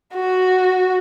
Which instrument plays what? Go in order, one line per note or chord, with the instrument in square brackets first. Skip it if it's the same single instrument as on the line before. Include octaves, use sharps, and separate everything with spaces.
[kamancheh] F#4